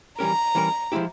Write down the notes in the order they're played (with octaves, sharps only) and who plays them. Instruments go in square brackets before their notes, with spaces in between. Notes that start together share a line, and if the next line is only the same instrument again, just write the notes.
[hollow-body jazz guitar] E3 G3 C#4 G4 A#4 [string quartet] A#5
[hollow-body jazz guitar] E3 G3 C#4 G4 A#4
F3 G#3 E4 G4